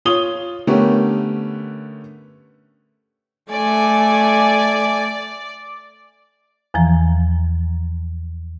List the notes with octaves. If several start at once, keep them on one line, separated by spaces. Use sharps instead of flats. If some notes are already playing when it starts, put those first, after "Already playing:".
F4 C#5 D#6 G7
D3 A3 B3 C#4 G4 A#4
A3 D5 G#5
E2 E3 F3 A#5